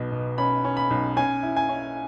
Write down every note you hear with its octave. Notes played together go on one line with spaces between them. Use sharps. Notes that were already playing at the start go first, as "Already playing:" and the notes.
Already playing: B1 B2
B2
C#4 B5
C#4
B5
B1
C#4 G#5
E4
G#5
C#4